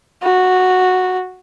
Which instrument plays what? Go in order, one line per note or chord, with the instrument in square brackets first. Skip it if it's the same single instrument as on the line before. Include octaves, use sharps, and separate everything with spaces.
[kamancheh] F#4